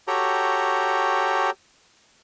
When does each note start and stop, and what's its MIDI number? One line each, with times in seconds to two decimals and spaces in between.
0.08 1.50 66
0.08 1.50 67
0.08 1.50 69
0.08 1.50 73
0.08 1.50 79
0.08 1.50 82